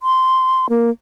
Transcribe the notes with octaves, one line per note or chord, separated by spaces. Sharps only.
C6
A#3